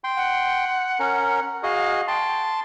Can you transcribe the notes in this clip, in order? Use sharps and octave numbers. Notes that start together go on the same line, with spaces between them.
G5 C6
F#5
C#4 A#4
F#4 G#4 D#5 F5
G5 A5 C6